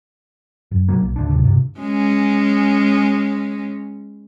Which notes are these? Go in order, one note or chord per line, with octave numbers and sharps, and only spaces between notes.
F#2
A#2 D3 F#3 A#3
B1
D2 A2 D4
D1 G#1 D#2 C3
G2 C3
G#3 C#4